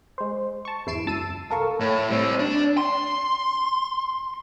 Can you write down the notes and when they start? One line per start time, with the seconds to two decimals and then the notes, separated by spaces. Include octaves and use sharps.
0.18 G#3 C5
0.65 A5 C#6
0.86 G#1 E2 E4 C7 D7 E7
1.05 C#2 F#2 A5 E6 D#7
1.50 C2 A4 A#4 F5 C#6
1.80 A2
2.10 G3 C4
2.39 D4
2.78 C6